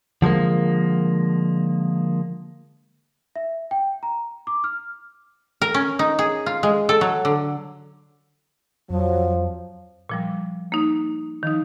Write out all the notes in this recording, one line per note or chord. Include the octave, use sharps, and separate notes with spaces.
D3 F3 G#3 A#3
E5
G5
A#5
D6
F6
A#4
C#4
D#4
G#4
F4
G#3
A4
F#3
D3
F2 F3 F#3
A#2 F3 G3
A#3 D#4
D#3 F3 D#4